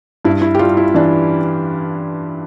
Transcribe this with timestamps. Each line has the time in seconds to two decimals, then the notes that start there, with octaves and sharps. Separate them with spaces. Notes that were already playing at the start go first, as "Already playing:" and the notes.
0.25 G2 E4
0.42 E4
0.55 G4
0.59 G3 F4
0.77 E4
0.95 E3 D4